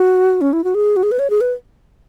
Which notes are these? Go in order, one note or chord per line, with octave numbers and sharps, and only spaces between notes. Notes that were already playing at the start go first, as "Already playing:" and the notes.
Already playing: F#4
C#4
E4
F#4
G#4
F#4
G#4
B4
C#5
G#4
B4